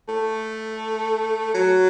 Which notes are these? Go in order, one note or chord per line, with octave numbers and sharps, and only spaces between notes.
A3
F#3